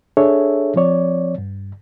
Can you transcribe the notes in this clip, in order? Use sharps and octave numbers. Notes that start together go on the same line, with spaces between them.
D4 G#4 A4 C#5 E5
F3 C4 C#5 D5
G2